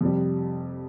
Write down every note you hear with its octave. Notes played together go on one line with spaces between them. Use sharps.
F2 C3 G3